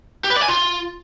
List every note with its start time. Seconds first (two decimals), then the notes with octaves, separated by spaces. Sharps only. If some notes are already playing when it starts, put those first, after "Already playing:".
0.24 G4
0.30 B4
0.36 D5
0.42 G#5
0.48 F4